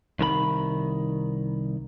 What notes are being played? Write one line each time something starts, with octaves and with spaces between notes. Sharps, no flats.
C2 D#3 A#4 B5